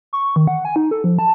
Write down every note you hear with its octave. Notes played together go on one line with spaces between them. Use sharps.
C#6
D#3
F#5
G#5
D#4
A4
F3
A5